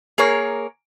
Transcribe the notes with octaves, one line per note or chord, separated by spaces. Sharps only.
A#3 G#4 A#4 C#5